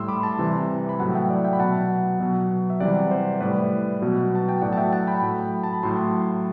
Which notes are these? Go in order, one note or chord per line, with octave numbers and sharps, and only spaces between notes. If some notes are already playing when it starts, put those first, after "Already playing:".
Already playing: A2 G3 C6 E6
B5 D6
A5 C6
C3 E3 G3
B5
A2 F#3 F#5 A5
E5 G5
D5 F#5
E5 G5
B5
B2 F#3 F#5 A5
B2 F#3
E5
C3 E3 G3 D5 F#5
C5
A2 G3 B4 D5
B2 F#3
A5
G5
A2 F#3 D5 F#5
A5
E5 G5
F#5 A5
G5 B5
A2 F#3
A5
B5
A2 F#3 A5 C6